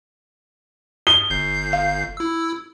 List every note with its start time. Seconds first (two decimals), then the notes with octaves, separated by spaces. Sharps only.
1.07 D#6 G7
1.30 G1 G6 C7
1.73 F5
2.17 E4 E6